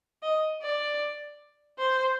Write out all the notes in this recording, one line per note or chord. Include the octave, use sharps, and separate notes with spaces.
D#5
D5
C5